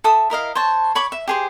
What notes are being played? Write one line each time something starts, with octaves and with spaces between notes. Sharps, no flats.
A4 E5 D#6
E4 A#4 D#5 F5
C5 C#5 A5
C#5 B5 C#6 D6
E5
G4 G#4 C5